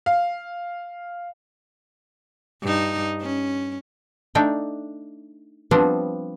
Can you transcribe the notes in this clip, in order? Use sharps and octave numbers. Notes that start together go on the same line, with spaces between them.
F5
G2 D#4
C#4
A3 D4 D#4 G5
F3 G3 B3 C4 D4